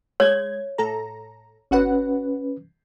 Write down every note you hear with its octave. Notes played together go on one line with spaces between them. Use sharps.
G#3 C#5 G#6
A2 A4 A#5
G1 C#4 F#4 B4 F#5